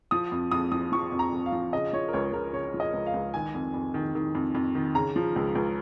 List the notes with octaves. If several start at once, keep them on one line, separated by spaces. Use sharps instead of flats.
F3 D#6
F2
F2 D#6
F3 D#6
F3 C#6
F2
A#5
F2
F5
F3
C#3 D#5
F3 C#5
A#4
C#2 C#5
C#2 A#4
C#3 C#5
F3
D#5
C#2
F5
C#2
D#3 G#5
F2
F2
D#3
D#3
F2
F2
D#3
C#3 A#5
F3
C#2
C#2